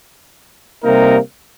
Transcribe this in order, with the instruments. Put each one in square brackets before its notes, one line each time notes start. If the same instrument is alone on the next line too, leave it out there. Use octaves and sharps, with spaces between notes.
[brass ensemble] C3 G3 A#3 D#4 A#4